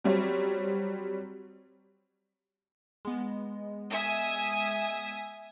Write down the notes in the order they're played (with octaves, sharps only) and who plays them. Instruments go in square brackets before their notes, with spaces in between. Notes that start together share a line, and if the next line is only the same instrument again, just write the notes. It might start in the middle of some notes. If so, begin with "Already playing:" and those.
[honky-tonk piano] F#3 G3 C4 C#5
[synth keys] G#3 B3
[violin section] E5 G#5 D#6